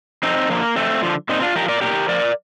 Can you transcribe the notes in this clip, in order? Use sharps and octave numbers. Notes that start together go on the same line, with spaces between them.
F2 C4 D#4
D3 F3 A#3
F2 A3 C4
D3 F3
A#2 C4 D#4
D4 F4
F3 G4 A#4
A#4 D5
A#2 G4 A#4
F3 A#4 D5